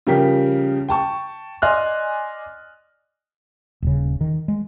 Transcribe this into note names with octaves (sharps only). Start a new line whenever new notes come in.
C#3 F3 G3 A#4 G5 B6
G5 A5 C#6
D5 D#5 G#5 C6 F6 F#6
D#1 C#3
D#3
G#3